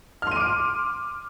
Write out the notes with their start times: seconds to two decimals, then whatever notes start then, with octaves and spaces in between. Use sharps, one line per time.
0.22 F6
0.27 C6
0.31 D#7
0.36 D6
0.41 D7